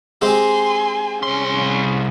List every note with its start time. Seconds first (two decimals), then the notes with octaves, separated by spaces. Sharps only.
0.22 G#3 C4 G4 G#5 C6
1.23 C2 C#4 C6